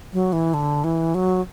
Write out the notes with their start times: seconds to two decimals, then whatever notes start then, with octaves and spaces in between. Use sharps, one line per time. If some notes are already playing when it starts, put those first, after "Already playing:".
0.13 F#3
0.33 E3
0.54 D3
0.84 E3
1.15 F#3